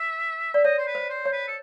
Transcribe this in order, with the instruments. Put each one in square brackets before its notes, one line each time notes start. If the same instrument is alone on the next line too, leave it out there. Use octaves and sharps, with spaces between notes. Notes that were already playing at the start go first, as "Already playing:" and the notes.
Already playing: [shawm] E5
[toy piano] D5 [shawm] E5
[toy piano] C#5 [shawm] D#5
[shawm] C5
B4
[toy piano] C5
[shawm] C5
[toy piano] C#5
[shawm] B4
A4